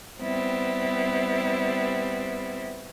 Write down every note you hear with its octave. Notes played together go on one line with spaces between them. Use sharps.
G3 B3 C4 E4